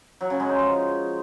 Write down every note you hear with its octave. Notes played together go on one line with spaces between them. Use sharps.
F#3
C#3
G#3
D#4
F3